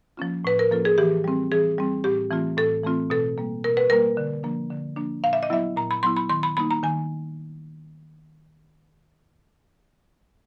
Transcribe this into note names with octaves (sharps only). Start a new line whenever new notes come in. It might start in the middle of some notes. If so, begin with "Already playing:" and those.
F3 A#3 C#4 F4
A2 B4
A#4
F3 A#3 C#4 F4 A4
G#4
E3 G4
G3 C4
E3 G#4
G3 C4
A2 G4
E3 A3 C4 F4
A2 A4
E3 A3 C4 F4
B2 A4
G3 A#3
B2 A#4
B4
G3 A#3 A#4
D3
F3 A#3 D4
D3
F3 A#3 D4
A#2 F5
E5
D#5
F#3 B3 E4 E5
A#2 A#5
B5
F#3 B3 E4 C6
B5
D#3 C6
B5
G3 A#3 D#4 B5
A#5
D#3 G#5